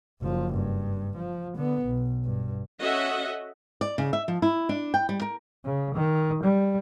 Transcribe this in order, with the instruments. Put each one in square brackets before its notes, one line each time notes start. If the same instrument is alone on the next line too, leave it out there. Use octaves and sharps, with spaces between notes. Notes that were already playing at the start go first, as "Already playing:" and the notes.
[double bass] F#1 F3
G2
F3
D3 B3
B1
G2
[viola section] C#4 F#4 A4 D#5 E5 F#5
[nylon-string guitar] D5
C#3
E5
F3
E4
D4
G5
G3
A#4
[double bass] C#3
D#3
G3